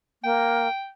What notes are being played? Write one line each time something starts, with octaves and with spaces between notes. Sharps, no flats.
A#3 G5